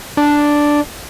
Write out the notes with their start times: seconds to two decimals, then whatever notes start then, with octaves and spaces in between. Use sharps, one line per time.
0.17 D4